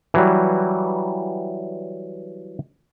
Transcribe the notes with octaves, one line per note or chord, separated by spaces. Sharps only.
E3 F#3 G3